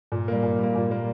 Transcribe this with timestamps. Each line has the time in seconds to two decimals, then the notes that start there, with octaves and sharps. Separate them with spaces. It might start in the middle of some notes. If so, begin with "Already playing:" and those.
0.12 A#2
0.28 G3 A#3
0.43 A#2
0.59 G3 A#3
0.75 A#2
0.90 G3 A#3